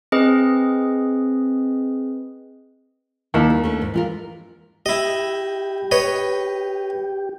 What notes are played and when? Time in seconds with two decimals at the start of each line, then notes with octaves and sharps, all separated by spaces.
0.12 C4 G#4 B4 D#5
3.34 D#2 D#3 E4 A5
3.50 G3
3.63 A3 C#4 D4
3.82 G#2
3.94 E3 F4 A#4
4.86 E4 G4 D#5
5.91 B4 C#5 D#5